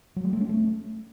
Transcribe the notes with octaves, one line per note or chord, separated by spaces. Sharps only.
F#3
G#3
A3
C#4
A3